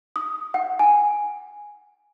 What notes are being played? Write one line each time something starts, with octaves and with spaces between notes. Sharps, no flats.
D#6
F#5
G#5